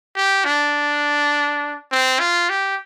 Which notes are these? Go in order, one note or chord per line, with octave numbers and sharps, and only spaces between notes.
G4
D4
C4
F4
G4